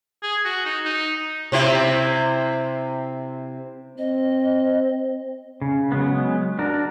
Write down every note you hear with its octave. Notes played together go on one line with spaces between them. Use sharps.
G#4
F#4
D#4
D#4
C3 C4 E4
C4 D#5
C#3
F#3 G#3 B3
D4 F#4 A#4